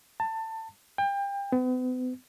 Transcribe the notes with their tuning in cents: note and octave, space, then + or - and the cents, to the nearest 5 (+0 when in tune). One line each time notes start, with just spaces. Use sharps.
A5 +20
G5 +30
B3 +40